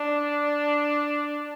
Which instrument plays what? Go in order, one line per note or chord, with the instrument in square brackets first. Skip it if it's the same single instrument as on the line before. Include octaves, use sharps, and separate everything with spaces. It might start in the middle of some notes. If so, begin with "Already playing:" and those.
Already playing: [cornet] D4